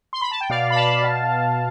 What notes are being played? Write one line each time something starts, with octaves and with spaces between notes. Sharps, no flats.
C6
B5
A5
G5
B2 D5 F5
B5
F5 A5
B2